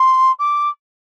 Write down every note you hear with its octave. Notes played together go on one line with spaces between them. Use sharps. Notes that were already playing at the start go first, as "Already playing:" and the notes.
Already playing: C6
D6